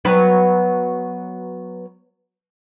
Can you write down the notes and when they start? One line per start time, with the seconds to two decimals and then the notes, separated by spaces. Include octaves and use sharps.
0.05 F#3 B3 B4